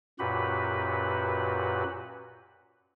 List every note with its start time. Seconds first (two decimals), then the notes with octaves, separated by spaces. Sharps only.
0.19 F#2 A#2 F#4 G4 B4 B5